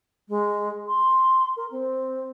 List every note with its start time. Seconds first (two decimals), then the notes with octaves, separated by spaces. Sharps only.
0.28 G#3
0.87 C6
1.57 A#4
1.71 C4